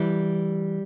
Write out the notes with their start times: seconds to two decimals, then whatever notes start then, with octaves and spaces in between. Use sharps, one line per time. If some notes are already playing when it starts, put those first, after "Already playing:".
Already playing: E3 G3